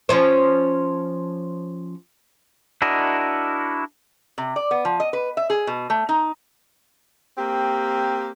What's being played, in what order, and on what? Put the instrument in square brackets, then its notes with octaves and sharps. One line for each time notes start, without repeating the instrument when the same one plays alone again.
[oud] F3 C#4 C5
[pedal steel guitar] D4 E4 F#4 A#4 D#5
[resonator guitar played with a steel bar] C3
D5
B3
F3
D#5
B4
E5
G#4
B2
A3
D#4
[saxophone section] A#3 C4 G4